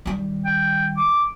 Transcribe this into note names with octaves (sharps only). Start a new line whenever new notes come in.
D#3 G3
G5
D6